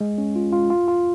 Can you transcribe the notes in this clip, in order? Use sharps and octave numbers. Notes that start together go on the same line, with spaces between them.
G#3
C#4
F4
F4
F4
F4